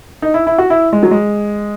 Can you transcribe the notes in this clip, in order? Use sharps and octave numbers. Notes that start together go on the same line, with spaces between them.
D#4
E4
E4
F#4
E4
G#3
F#3
G#3